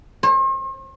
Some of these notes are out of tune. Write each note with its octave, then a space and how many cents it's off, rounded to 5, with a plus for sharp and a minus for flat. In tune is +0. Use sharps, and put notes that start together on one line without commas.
C5 +45